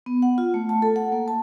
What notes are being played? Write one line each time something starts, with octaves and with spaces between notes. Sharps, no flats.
B3
F#5
F4
A3
A5
A4
F#5
A#3
A5